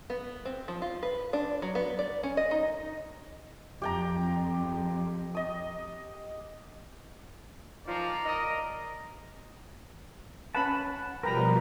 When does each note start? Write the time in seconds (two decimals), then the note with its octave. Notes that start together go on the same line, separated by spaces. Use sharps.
0.10 B3
0.45 C4
0.68 F3
0.82 F4
1.03 B4
1.33 D4
1.62 F#3
1.75 B3
1.99 D5
2.23 C#4
2.37 D#5
2.51 D#4
3.82 F2 G4 G5 A#5
5.35 D#5 D#6
7.86 D#3 F3 D5 A#5
8.25 A#4 D#5
10.55 C#4 B4 F#5 A5 B5
11.23 B2 F3 G3 A#4 B4 G5 A#5